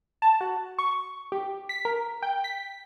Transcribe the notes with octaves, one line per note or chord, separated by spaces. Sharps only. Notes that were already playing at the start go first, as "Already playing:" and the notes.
A5
F#4
C#6
G4
B6
A#4
G5
B6